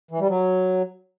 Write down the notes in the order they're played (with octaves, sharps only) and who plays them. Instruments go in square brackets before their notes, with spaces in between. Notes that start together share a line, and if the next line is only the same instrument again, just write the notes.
[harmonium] E3
G3
F#3